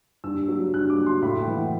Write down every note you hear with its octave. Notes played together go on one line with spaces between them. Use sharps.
G2 E6
F#3
G2 F#6
D6
F#3
C6
A2 B5
G5
E3
F#5